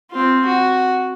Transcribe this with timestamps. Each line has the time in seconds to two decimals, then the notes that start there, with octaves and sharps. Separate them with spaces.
0.11 C4 F4
0.45 F#4